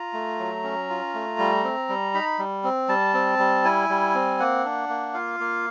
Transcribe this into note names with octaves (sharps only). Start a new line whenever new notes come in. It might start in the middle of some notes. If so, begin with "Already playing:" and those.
Already playing: F4 A#5
A3
F#3
C#4
F4
A3
G3
C4
G3
D#4 B5
G3
C4
G3 A5
C4
G3
E4 G#5
G3
C4
A#3 F#5
D4
A#3
F4 F5
A#3